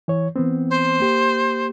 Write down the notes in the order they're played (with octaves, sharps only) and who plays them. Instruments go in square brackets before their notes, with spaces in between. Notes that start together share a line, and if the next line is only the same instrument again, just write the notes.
[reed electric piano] E3 C#5
E3 B3 C4
[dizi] C5
[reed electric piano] A#3 G4